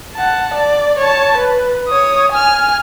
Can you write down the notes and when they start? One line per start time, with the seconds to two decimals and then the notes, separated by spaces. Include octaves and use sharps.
0.15 F#5 A5
0.54 D5
0.99 C#5 A5
1.37 B4
1.88 C#5 D#6
2.32 G#5 F6